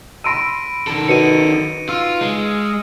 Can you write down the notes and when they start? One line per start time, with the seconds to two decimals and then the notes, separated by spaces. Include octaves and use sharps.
0.24 B5 C6 E6 A#6 D7 D#7
0.87 D#3 A4
1.08 D#4 F#4 B4 C#7 D#7
1.89 F4 E6 F6
2.21 G#3